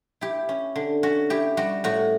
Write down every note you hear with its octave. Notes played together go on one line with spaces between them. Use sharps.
E4 G4
C#4
D3
C#4 F#4
E4 G4
G3 F#4
A2 F#4